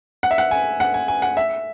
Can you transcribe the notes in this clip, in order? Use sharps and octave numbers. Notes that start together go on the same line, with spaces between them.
F#5
E5
F#5
G#5
F#5
G#5
G#5
F#5
E5